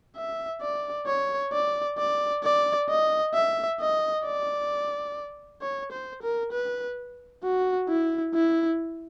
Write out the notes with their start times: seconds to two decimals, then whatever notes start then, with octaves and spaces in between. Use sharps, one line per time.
0.16 E5
0.62 D5
1.07 C#5
1.53 D5
1.98 D5
2.44 D5
2.89 D#5
3.34 E5
3.80 D#5
4.25 D5
5.62 C#5
5.92 C5
6.22 A#4
6.52 B4
7.43 F#4
7.89 E4
8.34 E4